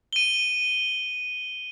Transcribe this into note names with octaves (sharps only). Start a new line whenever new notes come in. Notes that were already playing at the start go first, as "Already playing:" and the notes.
D#7 G7